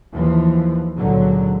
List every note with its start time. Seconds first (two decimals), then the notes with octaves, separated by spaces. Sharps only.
0.13 D#2 E3 F3
0.97 C#2 A#2 D3 F#3